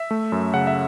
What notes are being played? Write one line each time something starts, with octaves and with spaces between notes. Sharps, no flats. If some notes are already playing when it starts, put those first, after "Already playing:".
Already playing: E5
A3
F#2
C#3 F#5
E5